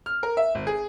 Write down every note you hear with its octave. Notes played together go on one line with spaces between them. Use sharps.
F6
A#4
E5
G#1
G#4